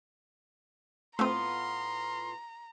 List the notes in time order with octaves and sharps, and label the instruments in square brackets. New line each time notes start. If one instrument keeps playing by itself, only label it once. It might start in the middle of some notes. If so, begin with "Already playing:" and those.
[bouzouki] A2 B3 F4 [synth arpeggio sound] A3 C4 [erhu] A#5 [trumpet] C6